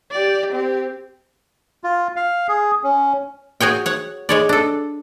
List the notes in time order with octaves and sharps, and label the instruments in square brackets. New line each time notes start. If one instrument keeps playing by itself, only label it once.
[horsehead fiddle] G4 D5
C4 G4
[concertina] F4
F5
G#4
C#4
[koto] F#4 G#4 C#5 G5
C#5 F#5
G#3 C#5 D5
D4 A4